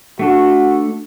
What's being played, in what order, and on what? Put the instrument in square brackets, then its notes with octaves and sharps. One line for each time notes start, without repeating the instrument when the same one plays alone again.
[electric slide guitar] A3 D4 A4 [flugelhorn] F#4